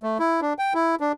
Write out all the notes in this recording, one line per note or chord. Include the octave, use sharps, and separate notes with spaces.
A3
E4
D4
G5
E4
D4